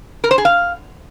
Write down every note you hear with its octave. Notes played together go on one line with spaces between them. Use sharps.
A#4
C5
G#4
F5